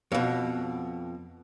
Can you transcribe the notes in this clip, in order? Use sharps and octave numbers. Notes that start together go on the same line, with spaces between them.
F2 B2